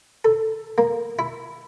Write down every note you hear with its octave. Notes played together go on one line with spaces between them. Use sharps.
A4
A#3
E4